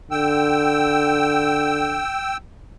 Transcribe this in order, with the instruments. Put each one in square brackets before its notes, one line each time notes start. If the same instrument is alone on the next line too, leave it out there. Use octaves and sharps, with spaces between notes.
[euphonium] D3 [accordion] G5 E6